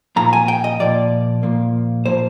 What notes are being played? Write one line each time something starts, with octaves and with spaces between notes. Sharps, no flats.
A#2 F3 A#3 A#5
G#5
G5
D#5
A#2 F3 A#3 D5
A#2 F3 A#3
A#2 F3 A#3 C5